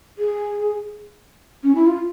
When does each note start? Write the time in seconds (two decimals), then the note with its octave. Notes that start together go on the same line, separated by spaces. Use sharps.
0.18 G#4
1.63 C#4
1.75 E4
1.87 F4